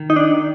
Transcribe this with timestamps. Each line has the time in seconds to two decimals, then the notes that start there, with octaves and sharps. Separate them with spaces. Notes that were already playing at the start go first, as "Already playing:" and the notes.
Already playing: D#3
0.10 D#4
0.16 D4